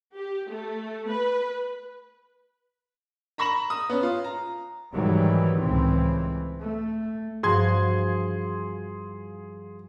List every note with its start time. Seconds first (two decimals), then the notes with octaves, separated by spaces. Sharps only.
0.16 G4
0.50 A3
1.09 B4
3.38 A#5 B5 C#6 A#6 E7 F#7
3.70 D#6
3.90 B3 C#4
4.03 F4
4.24 A#5
4.93 G#2 D#3 E3 F#3 G3
5.60 C#2 A2 E3 C4
6.59 A3
7.43 G2 F3 F#4 G#4 C6 G#6